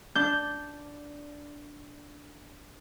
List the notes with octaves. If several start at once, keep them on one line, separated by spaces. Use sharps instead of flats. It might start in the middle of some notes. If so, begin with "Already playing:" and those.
D4 G6